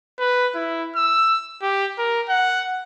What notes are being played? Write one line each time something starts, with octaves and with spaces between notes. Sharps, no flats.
B4
E4
E6
G4
A#4
F#5